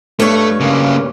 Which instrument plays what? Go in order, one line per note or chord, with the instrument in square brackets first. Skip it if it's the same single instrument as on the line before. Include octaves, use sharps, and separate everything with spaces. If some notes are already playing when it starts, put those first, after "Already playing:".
[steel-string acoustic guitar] G2 C#5 [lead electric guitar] A3
[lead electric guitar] C#3 A#3